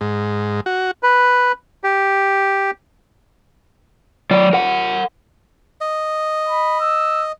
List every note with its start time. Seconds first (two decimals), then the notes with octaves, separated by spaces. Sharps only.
0.01 G#2
0.66 F#4
1.03 B4
1.84 G4
4.31 F#3 D5
4.53 A#4 F#5
5.81 D#5
6.48 B5
6.80 E6